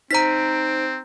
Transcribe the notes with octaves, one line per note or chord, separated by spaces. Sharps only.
C4 D#4 C5 A#5 B6 D7